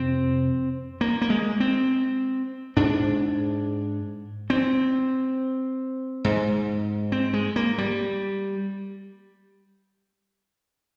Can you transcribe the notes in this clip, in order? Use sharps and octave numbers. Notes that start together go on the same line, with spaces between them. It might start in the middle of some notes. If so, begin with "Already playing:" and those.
Already playing: F2 C3 C4
A#3
A#3
G#3
C4
G#2 D4
C4
G#2
C4
G#3
A#3
G3